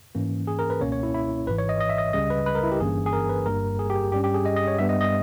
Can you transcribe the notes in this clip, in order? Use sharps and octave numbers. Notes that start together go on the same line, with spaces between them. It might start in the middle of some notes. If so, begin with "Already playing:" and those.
G#2 E3 A#3 C#4
G#4
A#4
B4
C#2 B2 A#3 C#4 C#5
C#5
E4
E4
G#1 G#2 E3 B4
C#5
D#5
D#5
E5
D#5
C#2 C#3 G3 D#5
B4
B4
A#4
E4
G4
G1 G2 E3 A#3 C#4 G#4
G#4
A#4
B4
G1 G2 G3 A#3 A#4
G#4
G4
G2 G3 C#4 G4
G4
G#4
D#5
D#5
C#5
G2 G3 B3 E5
D#5
D#5